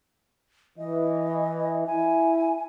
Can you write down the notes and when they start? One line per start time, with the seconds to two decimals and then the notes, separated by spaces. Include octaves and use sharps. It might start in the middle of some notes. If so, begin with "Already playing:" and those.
0.78 E3 D#5
1.86 E4 G#5